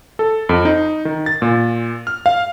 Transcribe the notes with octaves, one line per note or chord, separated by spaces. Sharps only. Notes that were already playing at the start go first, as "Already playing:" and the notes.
A4
F2
D#4
D#3
A6
A#2
F6
F5